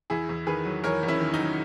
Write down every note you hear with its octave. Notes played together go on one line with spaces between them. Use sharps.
E2 E4 G#4
E2
D#3 G#4 B4
F#3
E2 A#4 C#5
E2
C#4 E4
D#3
D#4
F#3